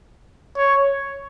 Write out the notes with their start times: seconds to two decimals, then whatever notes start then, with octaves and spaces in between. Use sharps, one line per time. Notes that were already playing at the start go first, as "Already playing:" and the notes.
0.56 C#5